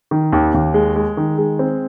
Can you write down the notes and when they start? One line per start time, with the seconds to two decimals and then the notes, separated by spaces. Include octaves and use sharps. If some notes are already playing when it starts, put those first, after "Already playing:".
0.11 D#3
0.32 D#2
0.54 D#2
0.74 G#3
0.96 G#3
1.17 D#3
1.38 G#3
1.59 C4